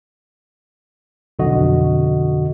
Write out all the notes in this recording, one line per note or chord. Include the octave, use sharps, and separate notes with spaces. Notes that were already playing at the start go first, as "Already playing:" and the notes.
B1 F2 D3 F#4 D#5